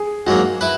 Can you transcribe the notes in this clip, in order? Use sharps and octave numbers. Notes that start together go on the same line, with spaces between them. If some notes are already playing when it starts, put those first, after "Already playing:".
Already playing: G#4
G#2 F#3 A#3 F#4
E4 B4